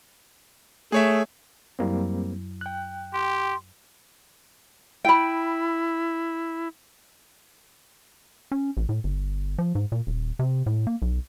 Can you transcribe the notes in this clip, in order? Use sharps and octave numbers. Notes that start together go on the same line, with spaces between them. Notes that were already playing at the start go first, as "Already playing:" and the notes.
A3 G#4 C#5 E5
F#2 F#3 G3 A#3 C4 E4
G5 F#6
G4 C6
E4 G5 B5
C#4
A1
A2
G1
F3
G#2
A#2
D#1
C3
A2
A#3
B1